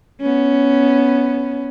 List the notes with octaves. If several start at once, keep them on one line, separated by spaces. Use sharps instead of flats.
B3 C#4